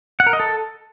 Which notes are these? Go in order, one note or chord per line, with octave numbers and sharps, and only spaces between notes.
F#5
A#4
D#5
A4